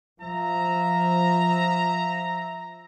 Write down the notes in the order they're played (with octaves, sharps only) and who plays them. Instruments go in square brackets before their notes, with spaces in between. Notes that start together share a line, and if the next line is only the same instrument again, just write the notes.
[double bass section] F3 [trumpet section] E5 A#5